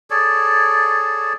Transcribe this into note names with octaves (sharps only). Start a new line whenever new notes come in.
G#4 A4 C#5 D5